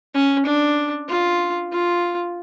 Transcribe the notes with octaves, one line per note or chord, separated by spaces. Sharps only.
C#4
D4
F4
F4